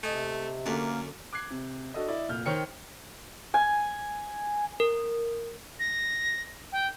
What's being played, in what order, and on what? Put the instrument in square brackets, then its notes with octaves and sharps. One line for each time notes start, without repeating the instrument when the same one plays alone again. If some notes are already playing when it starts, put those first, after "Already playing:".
[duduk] C3 [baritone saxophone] A3 [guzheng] D#5 G#5
[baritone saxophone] F#2 [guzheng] D3 A3 [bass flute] A#3
[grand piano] D6 F#6 G#6 C7
C3
D4 F#4 A4 D#5
E4 D5 D#5
F1 A#2 F6 G6
D#3 C5 C#5 G5 F6 C#7
[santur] G#5
[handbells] A#4
[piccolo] A#6
G5